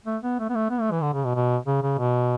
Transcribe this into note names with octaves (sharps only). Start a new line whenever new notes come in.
A3
B3
A3
B3
A3
B3
A3
E3
D3
C#3
B2
B2
C#3
C#3
B2